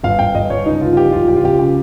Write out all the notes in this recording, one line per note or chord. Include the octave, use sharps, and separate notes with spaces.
G1 F5
G1 G5
G1 D#5
G1 C#5
C#2 D#4
C#2 F4
F4
F3 G4
C#2 F4
C#2 G4
F4
C#2 G4
C#3 G4